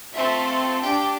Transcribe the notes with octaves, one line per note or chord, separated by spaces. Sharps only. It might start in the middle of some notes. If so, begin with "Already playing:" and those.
A3 C4 F4 A4 E5
D4 G4 G5